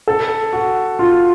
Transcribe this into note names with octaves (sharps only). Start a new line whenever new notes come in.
A4
F#4
F4